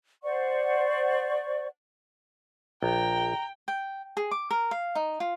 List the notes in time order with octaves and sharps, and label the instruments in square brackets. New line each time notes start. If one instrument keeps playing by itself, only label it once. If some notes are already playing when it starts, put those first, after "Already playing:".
[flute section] C5 D5 F#5 C#6
[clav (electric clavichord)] A#1 [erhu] G5 [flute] A#5
[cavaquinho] G5
G#4
D6
A#4
F5
D#4
F4